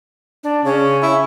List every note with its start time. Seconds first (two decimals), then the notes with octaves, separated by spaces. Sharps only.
0.43 D4
0.65 C#3 C#4
1.03 E4